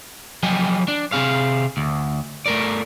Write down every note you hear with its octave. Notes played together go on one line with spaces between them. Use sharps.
F3 F#3 D#5 G5 G#5
D4
C3 C4 G#4 F5
D2
A3 A#4 D5